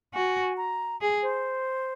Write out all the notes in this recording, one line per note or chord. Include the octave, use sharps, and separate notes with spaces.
F#4 G#5
A#5
G#4
C5